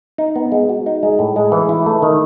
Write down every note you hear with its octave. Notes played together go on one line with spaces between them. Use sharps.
D#4
B3
G#3
F#4
D#4
G#3
A2
G#3
E3
E4
A3
D#3